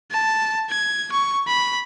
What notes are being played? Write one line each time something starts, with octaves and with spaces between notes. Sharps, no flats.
A5
G#6
C#6
B5